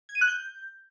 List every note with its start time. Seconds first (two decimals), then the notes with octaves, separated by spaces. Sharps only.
0.09 G#6
0.15 D#7
0.21 F#6
0.28 G6